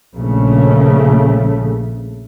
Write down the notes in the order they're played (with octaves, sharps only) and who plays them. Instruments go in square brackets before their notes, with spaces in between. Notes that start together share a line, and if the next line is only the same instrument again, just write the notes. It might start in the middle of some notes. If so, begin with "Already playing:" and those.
[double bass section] A#1 C#3 A3